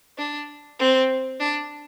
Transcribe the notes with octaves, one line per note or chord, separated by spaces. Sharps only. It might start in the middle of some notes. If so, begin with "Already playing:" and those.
D4
C4
D4